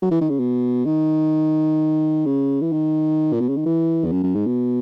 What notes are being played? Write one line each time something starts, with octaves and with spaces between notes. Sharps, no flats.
F#3
E3
D#3
C#3
B2
D#3
C#3
E3
D#3
A#2
B2
C#3
D#3
E3
E2
F#2
F#2
G#2
B2